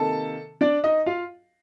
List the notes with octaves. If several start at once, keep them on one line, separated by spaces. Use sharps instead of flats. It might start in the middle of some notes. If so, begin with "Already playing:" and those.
Already playing: C3 D#3 A#3 A4 A5
D4 D5
D#4 D#5
F4 F5